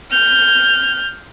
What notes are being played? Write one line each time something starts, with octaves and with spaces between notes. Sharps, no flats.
F6 G6